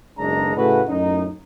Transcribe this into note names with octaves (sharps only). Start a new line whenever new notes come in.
F#1 B1 G#3 D4 D#4 A#5
A2 C#3 A3 E4 F#4 B4
F#2 A2 C#4 D#4